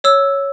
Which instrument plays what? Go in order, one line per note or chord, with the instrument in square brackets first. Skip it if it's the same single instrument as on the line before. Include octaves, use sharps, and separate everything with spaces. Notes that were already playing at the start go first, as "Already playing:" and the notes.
[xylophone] C#5 E6